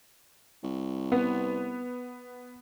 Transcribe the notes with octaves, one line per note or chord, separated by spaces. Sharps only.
C2
B3